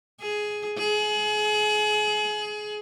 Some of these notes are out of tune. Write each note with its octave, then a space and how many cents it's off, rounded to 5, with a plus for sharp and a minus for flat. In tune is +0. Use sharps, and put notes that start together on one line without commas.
G#4 +10
G#4 +30